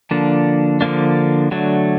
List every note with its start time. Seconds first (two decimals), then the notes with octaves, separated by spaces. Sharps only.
0.11 D3 F3 A#3 D4
0.81 D3 F3 A#3 D4
1.51 D3 F#3 A3 D4